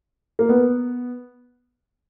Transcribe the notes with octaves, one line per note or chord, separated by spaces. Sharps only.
A#3
B3